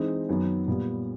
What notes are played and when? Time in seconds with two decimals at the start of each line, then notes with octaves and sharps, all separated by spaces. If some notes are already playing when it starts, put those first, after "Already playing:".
Already playing: E3 G#3 C4 D#4
0.29 F#2 D#3 F#3 B3
0.68 A#2 G3 B3